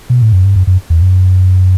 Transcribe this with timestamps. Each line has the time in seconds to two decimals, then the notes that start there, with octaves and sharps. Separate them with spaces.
0.10 B2
0.22 A2
0.33 F#2
0.44 G2
0.56 F#2
0.67 F#2
0.90 E2
1.02 F#2